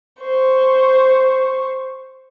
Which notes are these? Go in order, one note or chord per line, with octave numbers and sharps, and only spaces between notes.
C5 C#6